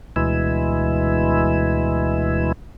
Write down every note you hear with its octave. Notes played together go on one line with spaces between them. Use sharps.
D2 B2 E3 G#3 E4